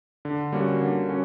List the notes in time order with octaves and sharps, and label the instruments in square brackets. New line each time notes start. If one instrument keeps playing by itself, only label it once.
[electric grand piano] D3
G3 A#3 C#4 F#4
D3
C#4 F#4